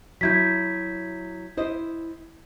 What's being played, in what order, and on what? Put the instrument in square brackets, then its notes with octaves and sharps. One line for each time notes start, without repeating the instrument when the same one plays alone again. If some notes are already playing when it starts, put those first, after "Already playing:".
[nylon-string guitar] F#3 E4 [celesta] G6 G#6 B6
[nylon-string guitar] E4 C5 D#5